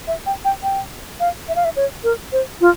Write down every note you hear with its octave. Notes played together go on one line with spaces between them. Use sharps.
E5
G5
G5
G5
F5
E5
F5
E5
C#5
A#4
C5
F4